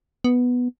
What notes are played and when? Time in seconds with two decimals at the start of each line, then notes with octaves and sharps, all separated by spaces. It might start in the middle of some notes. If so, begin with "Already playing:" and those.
0.24 B3